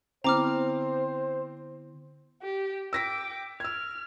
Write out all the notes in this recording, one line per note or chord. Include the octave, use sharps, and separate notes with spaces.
D3 B3 C4 E4 C5 A#5 D6 F6
G4
G5 D6 E6 A#6 B6
E6 F6 G#6